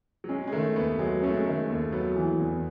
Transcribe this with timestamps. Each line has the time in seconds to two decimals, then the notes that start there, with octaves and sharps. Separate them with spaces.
0.24 F#3
0.29 G#3 C#4
0.48 G#3
0.52 D#3 A3
0.76 D#2 B3
0.99 F#3 G#3
1.23 A3 C#4
1.35 G#3
1.46 D#3 A3
1.59 G#3
1.69 D#2 A3
1.92 F#3 B3
2.16 E3
2.40 E2